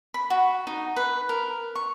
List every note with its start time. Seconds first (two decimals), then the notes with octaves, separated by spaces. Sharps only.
0.14 B5
0.30 F#4
0.67 D#4
0.96 B4
1.29 A#4
1.75 C#6